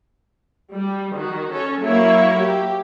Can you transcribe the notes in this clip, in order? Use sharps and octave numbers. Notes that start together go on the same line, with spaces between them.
G3
D#3 F#4
C#4 A4 C#5
F#3 A#3 E4 C#5 E5
G4